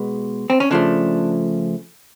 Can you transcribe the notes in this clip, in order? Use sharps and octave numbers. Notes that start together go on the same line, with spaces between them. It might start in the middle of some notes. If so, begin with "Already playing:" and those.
Already playing: B2 G#3 B3
C4
C#4
C#3 F3 A3 D4